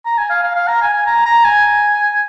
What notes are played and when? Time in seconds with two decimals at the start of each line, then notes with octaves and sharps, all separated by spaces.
0.06 A#5
0.18 G#5
0.30 F5
0.43 F5
0.55 F5
0.68 A#5
0.82 G#5
0.93 G#5
1.06 A#5
1.25 A#5
1.44 G#5